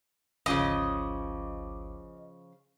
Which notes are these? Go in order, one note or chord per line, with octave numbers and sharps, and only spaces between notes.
G#1 D2 C#3 F3 C#4 D#5 D6